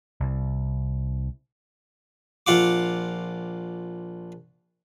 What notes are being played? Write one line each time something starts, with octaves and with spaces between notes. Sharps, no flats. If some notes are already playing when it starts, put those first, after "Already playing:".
C2
A#1 F4 F#5 D6